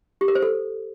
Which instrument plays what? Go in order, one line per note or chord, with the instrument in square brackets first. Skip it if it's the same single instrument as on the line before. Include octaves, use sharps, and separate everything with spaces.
[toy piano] G4
A#4
C5
A4